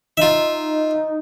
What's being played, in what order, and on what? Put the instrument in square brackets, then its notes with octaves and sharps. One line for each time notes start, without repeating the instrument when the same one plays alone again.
[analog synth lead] D#4 [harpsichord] F4 E5